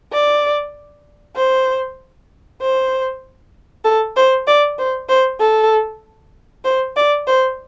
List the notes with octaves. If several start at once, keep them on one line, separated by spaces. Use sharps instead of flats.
D5
C5
C5
A4
C5
D5
C5
C5
A4
C5
D5
C5